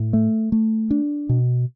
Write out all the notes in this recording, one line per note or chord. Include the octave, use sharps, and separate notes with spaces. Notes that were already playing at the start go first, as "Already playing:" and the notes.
Already playing: A2
A3
A3
D4
B2